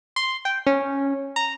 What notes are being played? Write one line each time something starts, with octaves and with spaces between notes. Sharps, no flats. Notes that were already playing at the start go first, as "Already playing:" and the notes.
C6
G5
C#4
A#5